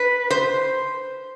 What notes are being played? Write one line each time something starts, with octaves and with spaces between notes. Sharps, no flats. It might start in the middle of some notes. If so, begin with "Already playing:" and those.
Already playing: B4
C5